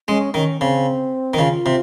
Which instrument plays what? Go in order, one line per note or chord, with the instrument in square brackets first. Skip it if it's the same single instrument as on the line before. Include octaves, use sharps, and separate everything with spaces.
[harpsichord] G#3 [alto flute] C#4
[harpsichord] D#3 [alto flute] C#4
[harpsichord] C#3 [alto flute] C4
[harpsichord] D#3
[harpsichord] C#3 [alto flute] F4
[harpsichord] C3